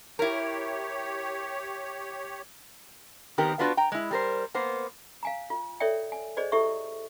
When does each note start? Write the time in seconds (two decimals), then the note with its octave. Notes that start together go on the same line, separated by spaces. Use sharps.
0.19 E4 G4 A#4 C#5
3.38 D#3 B3 C4 G4 A#4
3.59 B3 D4 F4 F#4 B4
3.77 G5 A#5
3.92 G#3 E4
4.11 G3 A#4 C5
4.54 A#3 B3 C5
5.23 F5 G#5 A#5
5.50 F4
5.80 A4 C#5 D5 E5 G5
6.12 G#5
6.37 G#4 C5 D5 D#5
6.52 E4 G4 A4 E5 C#6